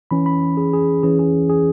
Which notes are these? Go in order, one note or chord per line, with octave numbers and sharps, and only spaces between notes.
E3 C#4 B5
B5
G#4
G#4
E3 C#4 G#4
G#4
G#4